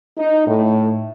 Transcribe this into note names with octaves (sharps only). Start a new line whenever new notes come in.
D#4
A2